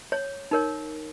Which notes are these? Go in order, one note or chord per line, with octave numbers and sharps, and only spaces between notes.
C#5
D#4 A#4 C#5